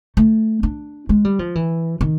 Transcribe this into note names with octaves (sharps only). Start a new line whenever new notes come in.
A3
D4
G#3
G3
F3
E3
D#3